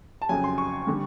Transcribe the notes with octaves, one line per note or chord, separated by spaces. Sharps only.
A5
F2 C#3 F#3 G#5
C6
C#6
D3 G3